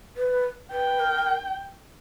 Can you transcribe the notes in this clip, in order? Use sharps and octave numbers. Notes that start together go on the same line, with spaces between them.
B4
B4 G5
A#4